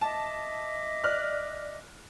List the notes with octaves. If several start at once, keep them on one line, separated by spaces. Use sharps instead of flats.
D#5 E5 A5 D6
D5 F6 F#6